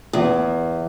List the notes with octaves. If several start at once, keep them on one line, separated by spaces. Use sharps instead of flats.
E2